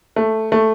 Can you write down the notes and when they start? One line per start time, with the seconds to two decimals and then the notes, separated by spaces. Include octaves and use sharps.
0.16 A3
0.52 A3